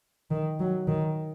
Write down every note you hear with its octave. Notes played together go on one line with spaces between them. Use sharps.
D#3
F#3
D#3